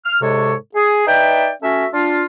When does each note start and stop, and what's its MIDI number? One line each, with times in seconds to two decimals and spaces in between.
0.05 0.19 89
0.21 0.54 44
0.21 0.54 48
0.21 0.54 56
0.21 0.54 69
0.21 0.54 73
0.75 1.06 68
1.07 1.49 63
1.07 1.49 71
1.07 1.49 74
1.07 1.49 76
1.07 1.49 79
1.62 1.86 57
1.62 1.86 61
1.62 1.86 66
1.62 1.86 76
1.92 2.24 62
1.92 2.24 65